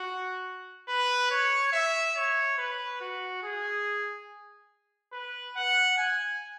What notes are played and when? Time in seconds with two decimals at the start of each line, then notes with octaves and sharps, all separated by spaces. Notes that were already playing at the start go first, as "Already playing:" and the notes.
Already playing: F#4
0.88 B4
1.31 C#5
1.72 E5
2.16 C#5
2.57 B4
3.01 F#4
3.42 G#4
5.13 B4
5.56 F#5
5.97 G#5